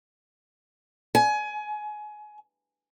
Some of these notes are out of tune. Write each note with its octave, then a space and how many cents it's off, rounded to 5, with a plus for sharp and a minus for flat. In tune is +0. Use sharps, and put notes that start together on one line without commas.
G#5 +25